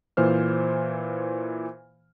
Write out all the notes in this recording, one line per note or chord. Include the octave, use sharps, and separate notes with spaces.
A#2 E3 C5 F6